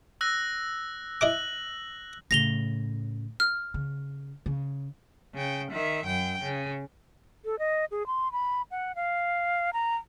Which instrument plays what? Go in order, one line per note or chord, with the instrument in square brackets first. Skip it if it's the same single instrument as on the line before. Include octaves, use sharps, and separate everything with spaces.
[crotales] E6 F#6 A#6
[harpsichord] E4 D#5 D6 [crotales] F#6 F#7
[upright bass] A2 C#3 [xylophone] A#6 F7 G7
[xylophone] F6
[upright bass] C#3
C#3
[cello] C#3 G5
D#3 E5
F#2 G5
C#3
[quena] A4
D#5
G#4
C6
B5
F#5
F5
A#5